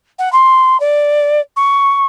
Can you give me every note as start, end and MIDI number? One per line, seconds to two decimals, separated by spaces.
0.19 0.32 78
0.33 0.80 84
0.80 1.41 74
1.57 2.06 85